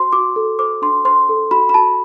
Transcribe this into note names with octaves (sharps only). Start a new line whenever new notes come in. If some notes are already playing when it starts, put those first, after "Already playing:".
Already playing: F#4 C5 C6
F#4 D6
A4
C5 D6
D4 C6
C5 C6
A4
F#4 B5
B5
F#4 A5